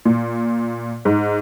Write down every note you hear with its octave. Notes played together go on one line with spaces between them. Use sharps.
A#2
G#2